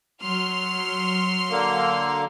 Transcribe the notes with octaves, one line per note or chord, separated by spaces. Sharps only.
F#3 C6 F6
D3 A#3